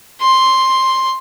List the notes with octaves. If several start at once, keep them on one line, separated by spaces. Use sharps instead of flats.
C6